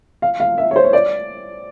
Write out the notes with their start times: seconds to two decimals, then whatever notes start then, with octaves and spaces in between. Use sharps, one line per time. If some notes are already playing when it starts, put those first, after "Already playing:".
0.22 F5
0.40 F5
0.58 E5
0.71 C#5
0.76 C5
0.84 C#5
0.93 D5